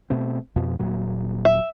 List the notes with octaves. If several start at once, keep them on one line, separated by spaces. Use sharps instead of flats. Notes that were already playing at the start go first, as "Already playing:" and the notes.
B2 A3 C4
F2 B2 F3
D#1 A#2 F#3
E5